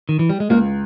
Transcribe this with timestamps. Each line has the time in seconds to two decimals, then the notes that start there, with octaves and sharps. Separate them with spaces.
0.09 D#3
0.19 E3
0.30 G3
0.40 G#3
0.50 C#2 A#3